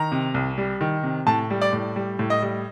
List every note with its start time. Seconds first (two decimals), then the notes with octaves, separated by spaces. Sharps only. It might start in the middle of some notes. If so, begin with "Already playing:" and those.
Already playing: D#3 A#5
0.12 C3
0.34 C2
0.58 G3
0.81 D#3
1.03 C3
1.27 A2 A5
1.50 G3
1.62 D5
1.73 A2
1.96 G3
2.19 A2
2.30 D#5
2.42 G3